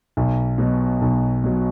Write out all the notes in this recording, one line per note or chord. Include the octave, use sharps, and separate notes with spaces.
B1
B2 F#3
B1
B2 F#3